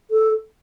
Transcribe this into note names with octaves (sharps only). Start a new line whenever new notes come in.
A4